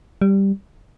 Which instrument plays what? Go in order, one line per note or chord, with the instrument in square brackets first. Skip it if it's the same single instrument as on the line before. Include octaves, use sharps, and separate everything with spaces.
[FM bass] G3